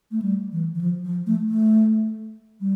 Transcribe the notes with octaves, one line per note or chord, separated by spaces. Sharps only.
A3
G3
E3
E3
F3
F3
A3
A3
G3